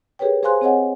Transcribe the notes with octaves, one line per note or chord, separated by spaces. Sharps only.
G4 G#4 A#4 B4 C#5 G5
G#4 C5 F5 G#5 C6 F#6
C4 G#4 C#5 D#5 F#5 G#5